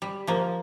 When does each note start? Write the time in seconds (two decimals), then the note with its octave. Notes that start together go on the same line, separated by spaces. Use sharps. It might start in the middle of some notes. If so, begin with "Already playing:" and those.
0.02 G3
0.27 F3 A#3